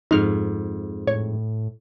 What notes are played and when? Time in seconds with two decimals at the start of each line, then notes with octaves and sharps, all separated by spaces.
0.11 F2 G#2 D#4 F6
1.07 A2 C#5